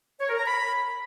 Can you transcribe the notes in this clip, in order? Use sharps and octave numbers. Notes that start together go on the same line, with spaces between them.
C#5
A#4
A#5
B5